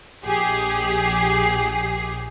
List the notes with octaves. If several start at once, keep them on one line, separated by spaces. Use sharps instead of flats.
A#1 G4 G#4 C7